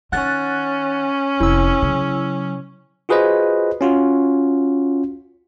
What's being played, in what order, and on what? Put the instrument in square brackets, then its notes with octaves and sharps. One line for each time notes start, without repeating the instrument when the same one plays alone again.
[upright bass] D#3 [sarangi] C#4 [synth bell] F#5 F#6 A6
[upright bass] F1 [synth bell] E4 E6
[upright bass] C#3 F#3
[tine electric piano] F4 F#4 G#4 B4 C5 D#5
C#4 F4 F#4